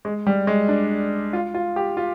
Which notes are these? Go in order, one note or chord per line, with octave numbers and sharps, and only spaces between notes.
G#3
G3
G#3
D4
F4
F4
G4
F4